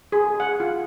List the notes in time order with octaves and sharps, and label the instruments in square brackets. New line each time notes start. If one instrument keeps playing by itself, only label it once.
[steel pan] G#4
F#5
F4